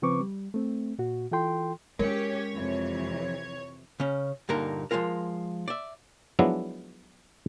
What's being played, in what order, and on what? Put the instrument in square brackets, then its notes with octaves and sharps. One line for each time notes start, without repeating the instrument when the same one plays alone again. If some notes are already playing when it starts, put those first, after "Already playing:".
[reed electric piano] C#3 F3 C4 B4 C#6 D6
G3
A3 C4
A#2 F#4
E3 F4 A4 G5 C6
[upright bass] G#3 [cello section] C#4 G4 [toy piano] A#4 [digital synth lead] C#5
[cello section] F2 C3 E3
[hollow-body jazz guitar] C#3 C#4
G2 A#2 D3 D#4 A#4 A#5
F3 F#3 G#3 F4 A#4
D5 E5
[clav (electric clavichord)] F3 F#3 G#3 B3 D4 E4